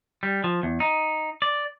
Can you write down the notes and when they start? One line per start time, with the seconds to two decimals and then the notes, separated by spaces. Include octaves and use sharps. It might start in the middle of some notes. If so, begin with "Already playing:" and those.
0.23 G3
0.44 F3
0.63 E2
0.80 D#4
1.42 D5